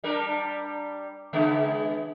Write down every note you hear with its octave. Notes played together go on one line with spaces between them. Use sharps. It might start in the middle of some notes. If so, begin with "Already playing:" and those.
G3 D4 A#4
C#3 G#3 B3